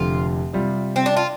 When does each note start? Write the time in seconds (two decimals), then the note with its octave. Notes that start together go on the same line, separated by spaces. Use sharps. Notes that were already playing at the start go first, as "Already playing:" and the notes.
Already playing: F1 F2 D3 F4
0.53 C3 G3 F4
0.96 C4
1.06 D4
1.17 F4